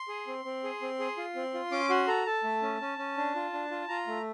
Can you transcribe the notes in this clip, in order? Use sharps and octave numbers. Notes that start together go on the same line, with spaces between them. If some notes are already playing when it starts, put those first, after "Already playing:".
Already playing: C6
G#4
C4
C4
G#4
C4
G#4
F4
C4
F4
C#4 D6
F#4 C6
A4 A#5
A4 A5
A3
C#4
C#4
C#4
D4
F4
D4
F4
F4 A#5
A3